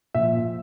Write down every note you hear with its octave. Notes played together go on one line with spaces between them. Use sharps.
A#2 F3 E5